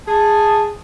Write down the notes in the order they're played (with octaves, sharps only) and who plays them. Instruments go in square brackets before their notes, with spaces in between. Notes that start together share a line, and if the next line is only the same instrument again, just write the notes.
[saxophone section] G#4 [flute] A5